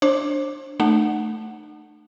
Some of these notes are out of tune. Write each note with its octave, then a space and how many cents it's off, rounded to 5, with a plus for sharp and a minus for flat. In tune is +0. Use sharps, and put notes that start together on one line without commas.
D4 +0 C5 +35
A3 +0 D#4 -45 F#5 +0